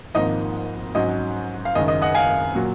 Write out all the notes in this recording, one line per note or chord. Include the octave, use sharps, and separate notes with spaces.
G#1 G#2 F3 A#3 D#4 D#5
G#2 F#3 C#4 D#5
F5
F#1 F#2 D#3 G#3 D#5
D#5
D#5 F#5
F5 G#5
A#2 F#3